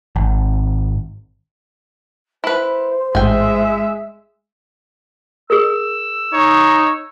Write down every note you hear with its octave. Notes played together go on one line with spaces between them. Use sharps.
G#1
E4 B4 C5
A1 G#2 G#3 E5 G5 G#5
G#4 A#4 E6
D#4 C#5